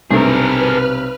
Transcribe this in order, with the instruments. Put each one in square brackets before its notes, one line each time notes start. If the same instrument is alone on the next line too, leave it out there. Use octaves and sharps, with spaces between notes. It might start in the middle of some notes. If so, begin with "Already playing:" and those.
[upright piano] B1 C3 [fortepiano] G2 A3 [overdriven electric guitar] G#4 A#4 [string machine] B4 F6